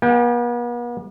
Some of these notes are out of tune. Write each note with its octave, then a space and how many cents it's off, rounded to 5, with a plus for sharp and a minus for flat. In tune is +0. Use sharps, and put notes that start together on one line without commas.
B3 -45 G5 +25